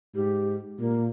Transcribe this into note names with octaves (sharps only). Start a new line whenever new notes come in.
G#2 G4
A#2 A#3